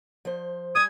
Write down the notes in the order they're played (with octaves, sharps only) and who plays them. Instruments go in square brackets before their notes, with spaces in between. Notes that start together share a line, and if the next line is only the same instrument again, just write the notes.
[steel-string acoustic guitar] F3 C5
[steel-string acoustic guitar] G3 G#5 [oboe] D#6 [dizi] G#6